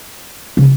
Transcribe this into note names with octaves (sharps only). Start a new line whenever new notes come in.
C#3